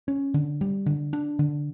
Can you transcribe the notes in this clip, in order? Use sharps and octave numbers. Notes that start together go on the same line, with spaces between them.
C#4
D3
G3
D3
D4
D3